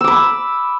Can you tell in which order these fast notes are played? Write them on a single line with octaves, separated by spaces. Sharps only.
E6 D6 B5